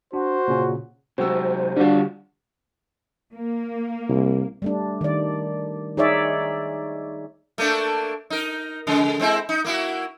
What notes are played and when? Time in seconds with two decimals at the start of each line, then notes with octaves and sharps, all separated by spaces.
0.13 D4 F#4 C5
0.48 A#2 C#3 C#4
1.18 C3 F#3 G#3 F#4 C5 E6
1.77 D3 G3 D4 F4 F#4
3.34 A#3
4.09 C2
4.62 G3 A3 D4
5.01 D#3 D5
5.97 D#4 G#4 C#5 D5 E5
7.58 A3 A#3 D4
8.30 D#4 A#4
8.87 C#3 G#3
9.20 G#3 C4 E4
9.49 D#4
9.65 A#3 E4 F#4